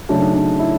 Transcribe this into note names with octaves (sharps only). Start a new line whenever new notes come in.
C#3 F#3 A3 D4
D#4
D4
E4